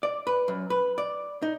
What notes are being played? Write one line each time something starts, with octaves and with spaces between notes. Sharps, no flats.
D5
B4
F#2
B4
D5
D#4